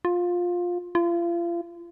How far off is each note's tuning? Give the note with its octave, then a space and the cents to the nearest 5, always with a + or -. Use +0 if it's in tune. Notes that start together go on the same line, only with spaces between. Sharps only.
F4 +15
F4 -35